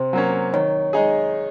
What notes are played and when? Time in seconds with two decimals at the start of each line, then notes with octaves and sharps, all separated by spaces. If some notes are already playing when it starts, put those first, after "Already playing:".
Already playing: C3 C5
0.13 F#3 A#3 C#4
0.53 D#3 C#5
0.93 G#3 D#4 G#4